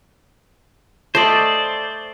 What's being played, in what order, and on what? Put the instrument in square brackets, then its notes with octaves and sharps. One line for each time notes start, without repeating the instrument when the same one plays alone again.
[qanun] A3 D#5 [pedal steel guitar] C5 D5